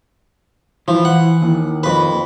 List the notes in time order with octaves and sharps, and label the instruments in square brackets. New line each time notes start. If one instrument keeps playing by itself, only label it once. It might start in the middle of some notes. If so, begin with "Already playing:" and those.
[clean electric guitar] E3 [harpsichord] F3
[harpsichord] F#5
[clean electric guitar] D#2
[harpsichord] F2 B4